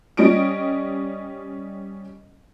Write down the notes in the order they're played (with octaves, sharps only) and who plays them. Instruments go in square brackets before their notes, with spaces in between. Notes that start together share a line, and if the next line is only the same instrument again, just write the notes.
[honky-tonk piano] G3 C#4 D#5 D7